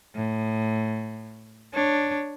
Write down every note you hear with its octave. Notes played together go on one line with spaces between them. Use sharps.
A2
D4 C#5